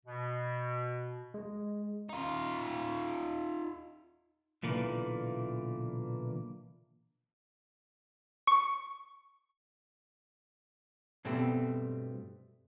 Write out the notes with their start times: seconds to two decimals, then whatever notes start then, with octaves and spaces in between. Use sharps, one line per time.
0.06 B2
1.34 G#3
2.09 D#4 F4
4.63 B1 A#2 D3 E3 A#3
8.47 C#6
11.25 G2 B2 G3 A3 C4